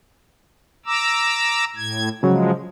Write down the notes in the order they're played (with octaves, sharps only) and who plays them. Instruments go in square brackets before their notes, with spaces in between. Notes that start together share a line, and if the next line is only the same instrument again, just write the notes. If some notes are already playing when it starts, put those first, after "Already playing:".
[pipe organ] A#5 D6 E6
A2 G#6
[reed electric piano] C#3 F#3 [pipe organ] F3 G#3